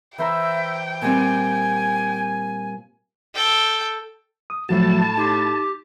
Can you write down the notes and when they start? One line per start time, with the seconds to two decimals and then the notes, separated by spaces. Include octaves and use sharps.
0.18 E3 C5 E5 G5 A#5
1.02 A#2 G3 C4 G#5
3.34 A4 G5
4.50 D#6
4.69 A2 F3 F#3 A3 F#4 A5
5.17 D#4 G4 C6